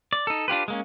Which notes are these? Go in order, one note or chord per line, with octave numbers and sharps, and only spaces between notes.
D5
D#4 A4
D4 F4 G4 B4
G#3 A#3 C#4